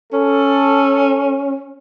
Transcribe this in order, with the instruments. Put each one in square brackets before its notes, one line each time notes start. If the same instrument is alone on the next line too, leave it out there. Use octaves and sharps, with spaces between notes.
[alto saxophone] C#4 [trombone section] A4